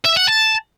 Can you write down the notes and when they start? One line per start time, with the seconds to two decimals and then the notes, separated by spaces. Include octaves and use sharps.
0.05 E5
0.16 F#5
0.28 A5